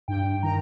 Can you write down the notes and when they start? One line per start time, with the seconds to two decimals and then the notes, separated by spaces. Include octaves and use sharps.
0.08 G2 G5
0.43 D#3 A#5